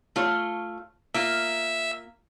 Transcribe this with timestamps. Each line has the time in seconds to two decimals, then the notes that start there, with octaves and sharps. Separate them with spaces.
0.16 A3 F4 C#5
1.14 A#3 F4 E5